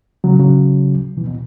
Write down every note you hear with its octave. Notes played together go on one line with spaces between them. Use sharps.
C#3 F#3
C#3 F#3
B2 E3
B2